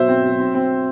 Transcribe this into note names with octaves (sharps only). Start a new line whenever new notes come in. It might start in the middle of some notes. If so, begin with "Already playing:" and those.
Already playing: B2 F#3 C5 E5
C4
F#3
C4
C4